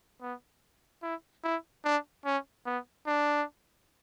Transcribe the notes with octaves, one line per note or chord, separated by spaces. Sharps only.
B3
E4
E4
D4
C#4
B3
D4